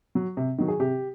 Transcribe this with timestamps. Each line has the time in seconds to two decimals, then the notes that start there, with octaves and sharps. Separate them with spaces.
0.15 F#3
0.37 C3
0.58 D#3 F#3
0.68 G#4
0.80 C3 G4